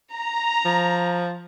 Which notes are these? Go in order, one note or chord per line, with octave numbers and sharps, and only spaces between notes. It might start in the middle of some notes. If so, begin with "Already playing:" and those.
A#5
F3